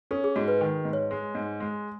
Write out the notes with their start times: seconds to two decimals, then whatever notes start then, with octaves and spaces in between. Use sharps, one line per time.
0.11 C#4 A4
0.24 G#4
0.36 G#2 F#4
0.48 B4
0.61 D#3
0.85 G#2
0.93 C#5
1.11 G#3
1.35 G#2
1.60 G#3